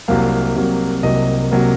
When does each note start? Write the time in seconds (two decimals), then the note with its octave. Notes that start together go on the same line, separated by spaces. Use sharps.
0.08 C2 C3 F#3 A#3 F5
0.56 C2 C3 F#3 A#3
1.03 C2 C3 F#3 A#3 D#5
1.51 C3 F#3 A#3